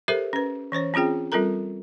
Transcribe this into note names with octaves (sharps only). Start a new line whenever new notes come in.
G4 A4 A#4 C5 E5
C#4 B4
E3 C#4 C5 C#5
C4 C#4 F4 G#4 G5
G3 C4 F4 A4 A#4 A#5